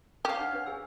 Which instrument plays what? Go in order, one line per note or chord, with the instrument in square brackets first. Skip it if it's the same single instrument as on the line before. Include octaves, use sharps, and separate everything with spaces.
[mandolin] C#4 F5 [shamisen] G4
[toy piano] D4 D#4 F#5
D4 B4
G#4 G#5 E6